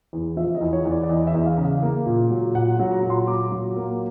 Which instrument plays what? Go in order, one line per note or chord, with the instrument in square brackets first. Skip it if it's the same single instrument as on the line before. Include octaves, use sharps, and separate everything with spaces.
[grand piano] E2
F3 E5
D#5
E2
C#5
E2
D5
D5
E2 D#5
E5
E2
F5
C#3
F5
A#3
A#2
F#3
A#2 F#5
F#3
A#5
A#2
C6
A#2 D6
F#3
A#3